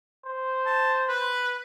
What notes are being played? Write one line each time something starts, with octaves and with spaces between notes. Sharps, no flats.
C5
A5
B4